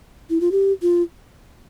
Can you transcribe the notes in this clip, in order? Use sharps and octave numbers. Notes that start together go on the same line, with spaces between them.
E4
F4
G4
F4